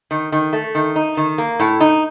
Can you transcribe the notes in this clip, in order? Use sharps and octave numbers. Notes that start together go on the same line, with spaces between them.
D#3
D#3
A3
D#3
D#4
D#3
A#3
A2
D#4